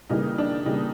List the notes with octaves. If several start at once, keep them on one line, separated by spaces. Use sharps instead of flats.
C#3 E3 G3 A#3 D#4
D4
C#3 E3 G3 A#3 D#4